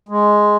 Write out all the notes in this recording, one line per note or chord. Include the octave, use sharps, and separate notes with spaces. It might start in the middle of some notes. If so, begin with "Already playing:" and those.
G#3